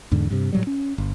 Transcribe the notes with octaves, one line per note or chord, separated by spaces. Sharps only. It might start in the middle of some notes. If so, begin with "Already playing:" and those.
E2 G#2 D3
G2 C3
A2 F#3 G3
C#4
G1